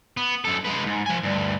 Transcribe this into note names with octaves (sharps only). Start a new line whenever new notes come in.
B3
F#2 A4
G#3 B4
D2 G#2
F3 G#5
D2 G2